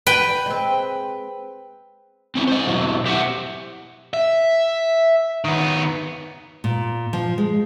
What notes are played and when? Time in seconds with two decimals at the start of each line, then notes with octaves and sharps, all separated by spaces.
0.07 B4 G5
0.46 G#3 C4
2.35 C4 C#4 E4
2.48 C5 D#5
2.67 B2 F#3 E4
3.06 G4 C5 E5 F#5
4.14 E5
5.44 D#3 B3
6.64 A#2
7.13 F3
7.38 G#3